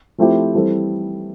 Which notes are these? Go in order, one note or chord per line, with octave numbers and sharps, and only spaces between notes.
F3 A3 C4 E4 G4
E3 G3 C4 E4 A4